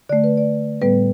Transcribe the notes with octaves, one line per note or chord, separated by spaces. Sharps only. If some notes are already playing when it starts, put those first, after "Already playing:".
D3 A3 D5
B4
D5
A2 G3 B3 B4